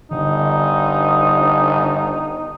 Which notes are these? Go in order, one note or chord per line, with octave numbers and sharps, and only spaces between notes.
G1 D3 D#4